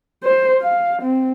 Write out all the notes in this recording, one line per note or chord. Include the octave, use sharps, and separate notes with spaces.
C5
F5
C4